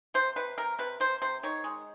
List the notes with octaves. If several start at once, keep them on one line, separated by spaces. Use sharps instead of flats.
C3 C5
C3 B4
C3 A#4
C3 B4
C3 C5
C3 C5
D#3 C#5
G#3